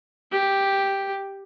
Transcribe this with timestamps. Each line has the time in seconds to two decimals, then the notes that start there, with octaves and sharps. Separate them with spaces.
0.32 G4